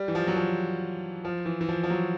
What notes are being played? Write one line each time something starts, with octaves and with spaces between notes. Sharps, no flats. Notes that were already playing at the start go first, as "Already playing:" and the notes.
Already playing: G3
E3
F3
F#3
F3
F3
E3
E3
F3
F3
F#3